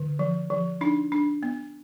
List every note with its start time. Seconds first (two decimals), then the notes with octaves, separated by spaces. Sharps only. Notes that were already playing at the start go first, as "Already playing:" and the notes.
Already playing: D3
0.19 F3
0.50 F3
0.81 D4 D#4
1.12 D4
1.43 B3